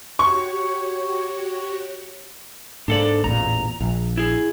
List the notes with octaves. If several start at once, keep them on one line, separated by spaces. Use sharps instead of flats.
F#4 G4 C#5 C#6
G#2 A#3 D4 A4 D5
A1 E2 A#2 A#5
A#1
E4 G#4